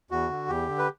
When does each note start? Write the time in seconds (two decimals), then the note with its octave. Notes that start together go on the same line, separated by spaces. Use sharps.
0.11 E2 F#4
0.30 D3
0.48 E2 G4
0.68 D3
0.78 B4